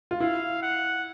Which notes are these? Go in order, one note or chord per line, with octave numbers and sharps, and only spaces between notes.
F4
E4 F5
F#5